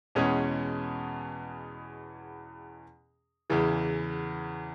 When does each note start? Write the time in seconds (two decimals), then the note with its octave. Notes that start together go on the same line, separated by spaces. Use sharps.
0.15 E2 B2 G#3 C#4 G#4
3.50 E2 C#3 E3